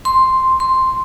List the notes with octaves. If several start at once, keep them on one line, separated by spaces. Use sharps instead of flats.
C6
C6